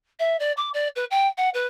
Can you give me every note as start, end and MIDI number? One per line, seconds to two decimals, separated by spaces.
0.19 0.37 76
0.40 0.52 74
0.57 0.70 86
0.74 0.88 74
0.96 1.05 71
1.11 1.27 79
1.37 1.50 78
1.54 1.67 71